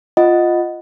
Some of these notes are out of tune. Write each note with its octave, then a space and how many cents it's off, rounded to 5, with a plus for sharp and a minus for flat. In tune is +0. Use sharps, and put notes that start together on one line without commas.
F4 +0 D#5 +0 F#5 +0